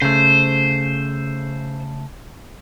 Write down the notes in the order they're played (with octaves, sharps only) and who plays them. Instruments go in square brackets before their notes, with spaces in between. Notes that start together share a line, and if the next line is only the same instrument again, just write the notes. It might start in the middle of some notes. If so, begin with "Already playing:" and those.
[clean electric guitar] C#3 A3 [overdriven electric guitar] C5